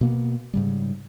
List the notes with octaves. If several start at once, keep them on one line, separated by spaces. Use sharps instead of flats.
B2 A#3 B3
G#2 C#3 G3